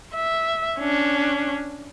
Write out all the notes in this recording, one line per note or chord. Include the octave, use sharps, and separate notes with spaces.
E5
C#4 D4